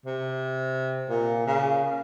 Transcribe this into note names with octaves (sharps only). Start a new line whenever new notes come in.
C3
A#2
C#3